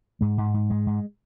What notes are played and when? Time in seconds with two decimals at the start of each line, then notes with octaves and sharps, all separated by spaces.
0.21 G#2 G#3
0.38 G#2
0.54 G#2
0.70 G#2 G#3
0.87 G#2